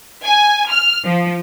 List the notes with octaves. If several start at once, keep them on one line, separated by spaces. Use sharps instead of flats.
G#5
F6
F3